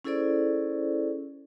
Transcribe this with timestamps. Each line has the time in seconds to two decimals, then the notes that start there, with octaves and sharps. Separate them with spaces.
0.05 C#4 E4 G#4 A4 C5 D5